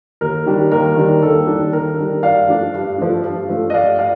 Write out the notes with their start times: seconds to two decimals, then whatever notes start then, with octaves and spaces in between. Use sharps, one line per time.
0.21 D#2 A#4
0.46 D#3 G3 D4
0.72 D#2 A#4
0.96 D#3 G3 D4
1.22 D#2 A4
1.47 D#3 G3 D4
1.72 D#2 A#4
1.98 D#3 G3 D4
2.22 G2 D5 F5
2.48 F3 A3 D4
2.74 G2
2.98 F3 A3 D4
3.24 G2
3.49 F3 A3 D4
3.70 D#5
3.74 G2 D5 F5
3.99 D5 F5